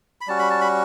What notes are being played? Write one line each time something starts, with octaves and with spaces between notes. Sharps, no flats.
B5
G3 C#4 F#4 A5
B5
A5
B5